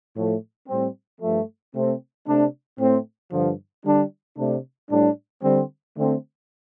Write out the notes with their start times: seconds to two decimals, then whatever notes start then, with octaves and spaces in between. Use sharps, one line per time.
0.16 A2 F3 A3
0.68 A2 G3 C4
1.21 G2 F3 A3
1.74 C3 A3 C4
2.26 C3 A3 D4
2.79 A2 A3 C4
3.32 G2 D3 F3
3.84 D3 G3 D4
4.37 C3 A3 D4
4.90 A2 G3 D4
5.42 D3 G3 C4
5.96 D3 A3 C4